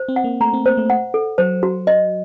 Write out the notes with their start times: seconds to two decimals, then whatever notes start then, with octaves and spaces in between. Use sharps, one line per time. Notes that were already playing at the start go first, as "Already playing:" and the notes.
Already playing: C5
0.08 C4
0.16 F#5
0.24 A#3
0.40 A3 A#5
0.53 C4
0.65 A#3 C5
0.77 A3
0.90 F#5
1.14 A4
1.38 F#3 C5
1.63 F#4
1.87 D#5